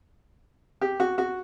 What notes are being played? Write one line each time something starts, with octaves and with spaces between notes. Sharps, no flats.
G4
F#4
F#4